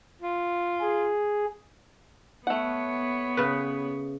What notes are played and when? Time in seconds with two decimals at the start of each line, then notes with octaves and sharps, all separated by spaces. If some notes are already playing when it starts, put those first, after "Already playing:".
0.22 F4
0.81 G#4
2.47 A3 B3 C#5 F#5
3.37 C#3 B4